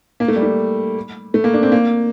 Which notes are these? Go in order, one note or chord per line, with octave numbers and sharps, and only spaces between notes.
A#3
A3
G3
A3
A3
A#3
D4
C4
A#3